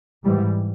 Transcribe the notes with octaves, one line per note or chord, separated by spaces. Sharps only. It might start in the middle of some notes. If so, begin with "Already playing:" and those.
G#2 E3 G3